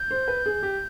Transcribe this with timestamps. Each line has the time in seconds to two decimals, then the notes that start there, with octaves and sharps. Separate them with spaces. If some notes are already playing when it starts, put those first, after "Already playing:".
Already playing: G6
0.11 C5
0.28 B4
0.46 G#4
0.63 G4